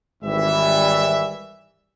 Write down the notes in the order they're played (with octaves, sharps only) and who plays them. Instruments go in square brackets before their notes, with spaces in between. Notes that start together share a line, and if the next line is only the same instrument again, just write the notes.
[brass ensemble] G#1 E3 G3 E5